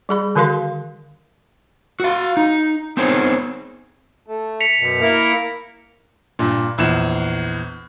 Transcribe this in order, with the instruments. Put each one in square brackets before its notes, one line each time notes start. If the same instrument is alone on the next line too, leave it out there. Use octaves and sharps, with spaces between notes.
[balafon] G3 G#4 B5
D3 D#3 F#4 A#4 F5 C6
[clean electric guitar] F#4 F5
D#4
B3 C4 D#4 G#4 C5 C#5
[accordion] A3
[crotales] B6 C#7 F7
[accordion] F#2 B2
A#3 E4 A#4
[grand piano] G2 A#2
A#1 E2 E7